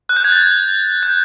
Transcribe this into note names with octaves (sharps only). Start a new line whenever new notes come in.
F#6
G6
G#6
A6
G6